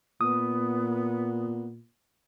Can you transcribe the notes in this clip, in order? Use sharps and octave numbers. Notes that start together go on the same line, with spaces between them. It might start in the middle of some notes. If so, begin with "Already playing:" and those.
A#2 B3 D#6